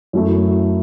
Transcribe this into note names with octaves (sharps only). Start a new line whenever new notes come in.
F#2 F#3 A3 E4